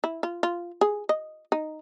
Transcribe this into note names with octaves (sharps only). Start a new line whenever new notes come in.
E4
F4
F4
G#4
D#5
D#4